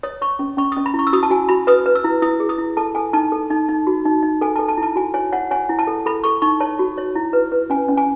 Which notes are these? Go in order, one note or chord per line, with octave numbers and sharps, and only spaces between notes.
C#5 D#6
C#5 C#6
C#4
C#4 C#6
D#6
C#4
B5
E4
C#6
E6
F#4 D#6
A5
F#4 G#5
F#4 B5
B4 D#6
B4
E6
E4
E4 D#6
G#4
D#6
E4
A4 A5
A4 G#5
D#4 A5
A4
D#4
D#4
F#4
D#4
D#4
A4 G#5
A4 A5
A5
E4
A5
F#4 G#5
C#5 G#5
C#5 F#5
C#5 G#5
E4
A5
A4
A4 B5
A4 C#6
D#4 C#6
C#5 A5
F#4
C#5
E4
B4
B4
C#4 G#5
C#4
G#5